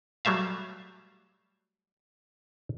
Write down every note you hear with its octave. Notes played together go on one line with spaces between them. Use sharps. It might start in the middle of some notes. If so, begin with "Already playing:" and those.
F#3 G3 A3 E5 F5